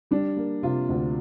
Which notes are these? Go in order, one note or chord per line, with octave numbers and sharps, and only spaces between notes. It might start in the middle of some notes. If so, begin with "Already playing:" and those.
G3 D4
A#3
C3 F4
D2